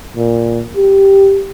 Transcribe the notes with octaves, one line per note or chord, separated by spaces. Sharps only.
A#2
G4